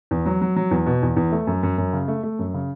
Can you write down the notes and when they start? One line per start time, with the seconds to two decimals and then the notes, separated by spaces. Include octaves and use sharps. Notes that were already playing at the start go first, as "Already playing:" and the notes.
0.11 E2
0.26 F#3
0.42 F#3
0.56 F#3
0.71 E2
0.86 B2
1.02 E2
1.17 E2
1.32 A3
1.47 F#2
1.63 F#2
1.78 F#2
1.93 C#3
2.08 A3
2.23 A3
2.39 F#2
2.54 C#3